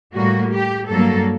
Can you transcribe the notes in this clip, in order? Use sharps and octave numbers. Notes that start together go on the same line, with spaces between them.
A2 G3 A#3 F#4
G4
G2 F#3 A#3 A4